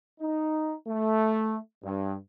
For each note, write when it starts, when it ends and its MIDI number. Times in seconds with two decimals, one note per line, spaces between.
0.20 0.72 63
0.87 1.56 57
1.83 2.15 43